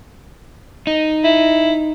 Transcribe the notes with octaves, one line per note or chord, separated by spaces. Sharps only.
D#4
E4